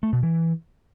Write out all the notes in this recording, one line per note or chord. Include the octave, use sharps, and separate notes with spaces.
A3
B2
E3